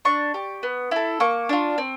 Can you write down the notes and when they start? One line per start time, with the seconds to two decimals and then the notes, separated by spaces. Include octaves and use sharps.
0.05 D4 C#6
0.34 G4
0.63 B3
0.91 E4 A4
1.20 A#3 C#6
1.49 D4 F4
1.78 C4